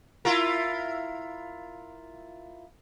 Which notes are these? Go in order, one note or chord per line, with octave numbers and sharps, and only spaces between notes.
E4 F4 A#4